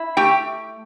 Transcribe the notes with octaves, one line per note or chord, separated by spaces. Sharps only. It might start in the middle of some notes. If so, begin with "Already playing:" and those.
Already playing: E4
A3 G4 G5